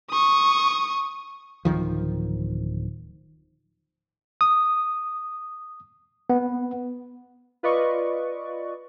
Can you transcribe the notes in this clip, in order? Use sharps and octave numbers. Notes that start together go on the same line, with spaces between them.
C#6 D#6
D1 G1 D#3 F3
D#6
B3
F4 B4 D5 D#5 C#6